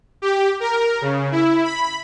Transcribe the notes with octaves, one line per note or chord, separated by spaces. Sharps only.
G4
A#4
C#3
E4
B5